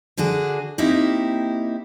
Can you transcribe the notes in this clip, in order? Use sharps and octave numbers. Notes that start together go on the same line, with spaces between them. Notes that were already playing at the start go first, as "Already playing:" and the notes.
D3 D4 F#4 G#4
A#3 C4 D#4 E4 G4